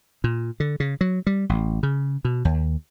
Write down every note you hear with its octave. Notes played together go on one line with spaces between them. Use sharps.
A#2
D3
C#3
F#3
G3
A1
C#3
B2
D#2